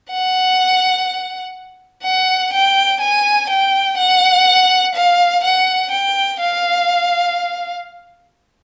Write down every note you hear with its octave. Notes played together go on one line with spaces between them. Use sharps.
F#5
F#5
G5
G#5
G5
F#5
F5
F#5
G5
F5